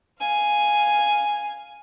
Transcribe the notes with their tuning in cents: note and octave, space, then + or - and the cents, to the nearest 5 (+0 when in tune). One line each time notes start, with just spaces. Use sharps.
F5 +0 G#5 +0